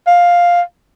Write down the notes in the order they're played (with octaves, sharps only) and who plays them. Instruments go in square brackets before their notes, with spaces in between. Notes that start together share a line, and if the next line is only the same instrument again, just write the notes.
[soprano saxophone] F5